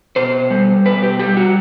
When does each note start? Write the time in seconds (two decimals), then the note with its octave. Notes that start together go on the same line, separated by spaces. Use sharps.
0.16 B2 C5
0.50 G3
0.86 B2 B4
1.03 G4
1.19 G3 G4
1.37 F#4